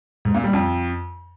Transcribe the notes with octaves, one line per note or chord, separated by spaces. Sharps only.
G#2
A#2
G3
F2